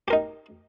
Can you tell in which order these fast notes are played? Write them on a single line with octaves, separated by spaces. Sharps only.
G4 A#4 D#4